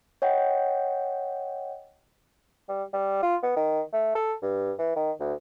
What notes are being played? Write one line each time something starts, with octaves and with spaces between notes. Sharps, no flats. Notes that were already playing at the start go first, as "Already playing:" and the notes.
C#5 D#5 F#5 G5
G3
G3
F4
B3
D#3
A3
A4
G2
E3
D#3
D2